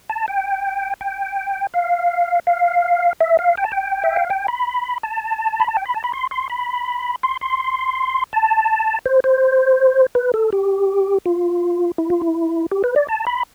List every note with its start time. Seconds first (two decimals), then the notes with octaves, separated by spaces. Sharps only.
0.10 A5
0.28 G5
1.01 G5
1.74 F5
2.47 F5
3.20 E5
3.39 F5
3.57 G5
3.64 A5
3.72 G5
4.04 E5
4.16 F5
4.30 G5
4.48 B5
5.03 A5
5.60 B5
5.68 A5
5.77 G5
5.86 B5
5.94 A5
6.04 B5
6.13 C6
6.31 C6
6.50 B5
7.23 C6
7.41 C6
8.33 A5
9.06 C5
9.24 C5
10.15 B4
10.34 A4
10.53 G4
11.26 F4
11.98 E4
12.10 F4
12.21 E4
12.71 G4
12.84 B4
12.96 D5
13.08 A5
13.27 B5